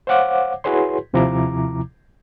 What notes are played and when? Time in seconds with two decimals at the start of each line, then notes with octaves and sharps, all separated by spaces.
0.07 C5 C#5 F5 F#5 D6
0.64 E4 F#4 G#4 B4 C#5 C6
1.13 D#2 C3 F3 E4 A#5 D6